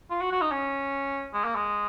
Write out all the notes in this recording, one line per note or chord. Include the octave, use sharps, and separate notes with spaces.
F4
F#4
F#4
D#4
C#4
G#3
A#3
G#3